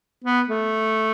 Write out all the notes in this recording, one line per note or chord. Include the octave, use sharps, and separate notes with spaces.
B3
A3